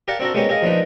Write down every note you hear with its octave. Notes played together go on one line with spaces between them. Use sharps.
G4 A#4 D5 F5 F#5 A5
C4 D4 F#4 A4 A#4
G#3 A#3 B3 C#4 G4
G4 G#4 D#5 F5
F3 A#3 D4 D#4 B4